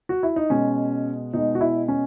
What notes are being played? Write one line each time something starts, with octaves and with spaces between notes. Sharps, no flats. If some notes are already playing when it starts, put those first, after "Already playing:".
F#4
E4
D#4
B2 G#3 C#4
B2 G#3 D#4
F#4
E4
C#4